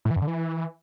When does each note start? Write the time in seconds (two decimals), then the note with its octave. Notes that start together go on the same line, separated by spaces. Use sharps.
0.05 A2
0.11 E3
0.16 F#2
0.22 D3
0.27 E3